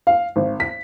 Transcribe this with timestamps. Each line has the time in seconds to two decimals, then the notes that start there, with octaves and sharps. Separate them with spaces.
0.07 F5
0.36 G#1
0.60 B6